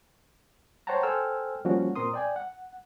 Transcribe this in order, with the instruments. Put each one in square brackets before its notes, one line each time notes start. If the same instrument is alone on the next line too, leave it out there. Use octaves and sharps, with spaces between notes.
[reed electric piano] C5 C#5 F#5 G5 A5 A#5
A4 C5 G5 G#5 E6 F6
F3 G3 A#3 C#4 F#4
A#2 C4 A#4 C6 D#6
D5 G5 G#5
F#5